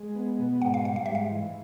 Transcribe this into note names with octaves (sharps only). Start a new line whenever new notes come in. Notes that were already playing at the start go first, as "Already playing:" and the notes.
Already playing: G#3
B3
B2
G#2 F#5
F5
G3 F5
F5
G#2 E5
F5
E3